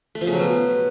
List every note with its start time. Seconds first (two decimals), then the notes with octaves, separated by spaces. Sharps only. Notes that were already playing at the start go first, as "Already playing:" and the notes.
0.15 A3
0.21 F3
0.27 C#3
0.33 F#3
0.39 B2